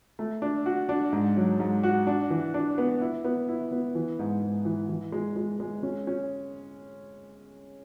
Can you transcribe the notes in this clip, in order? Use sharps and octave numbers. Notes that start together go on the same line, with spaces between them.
A3
D4
F#4
D4
G#2
F#3
G#2
F#4
D4
E3
D4
B3
E4
B3
E4
B3
E3
G#2
G#2
E3
E3
G#3
G#3
G#3
C#4
C#4